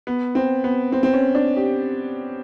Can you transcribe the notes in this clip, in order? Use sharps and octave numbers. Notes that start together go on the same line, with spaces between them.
B3
C4
B3
C4
C4
C#4
D4
G4